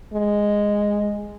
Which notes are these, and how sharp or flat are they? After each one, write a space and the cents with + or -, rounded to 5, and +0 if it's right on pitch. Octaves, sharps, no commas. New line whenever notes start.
G#3 -5